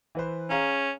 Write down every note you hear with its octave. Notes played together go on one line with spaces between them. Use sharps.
E3 B4 C5
C#4 G#4 F5 A#5